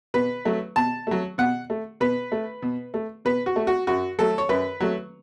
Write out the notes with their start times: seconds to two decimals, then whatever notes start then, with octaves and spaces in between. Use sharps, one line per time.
0.14 B2 B4
0.45 F#3 A3
0.76 B2 A5
1.07 F#3 A3
1.38 B2 F#5
1.70 A3
2.00 B2 B4
2.32 A3
2.62 B2
2.94 A3
3.25 B2 B4
3.46 F#4
3.56 A3
3.67 F#4
3.87 F#2 F#4
4.19 F#3 A3 A4
4.38 C#5
4.49 F#2 B4
4.80 F#3 A3